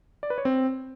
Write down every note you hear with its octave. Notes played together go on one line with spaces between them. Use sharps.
D5
B4
C#5
C4